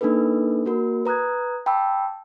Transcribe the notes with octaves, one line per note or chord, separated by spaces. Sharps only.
A#3 D4 D#4 A4 B4
A#3 F#4 A#4
B4 A#5 D#6 F#6 G#6
G5 A5 B5 D6 E6